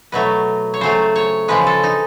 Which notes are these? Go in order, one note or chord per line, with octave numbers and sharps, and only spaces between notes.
B2 F#3 A3 B4
C#5
C#3 F#3 A3 C5
C#5
C#3 F3 G#3 B4
A4
D#4